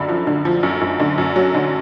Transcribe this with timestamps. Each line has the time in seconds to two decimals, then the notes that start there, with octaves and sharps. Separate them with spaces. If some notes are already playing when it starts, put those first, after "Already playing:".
Already playing: F#2 D3 B5
0.09 F3
0.27 D3
0.45 F3
0.63 F#2
0.81 F#2
1.00 D3
1.18 F#2
1.36 F#3
1.54 D3